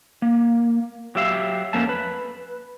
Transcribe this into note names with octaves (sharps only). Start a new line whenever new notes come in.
A#3
F#3 G4 E5 F5
F2 A3 A#3 C#4 A5
B4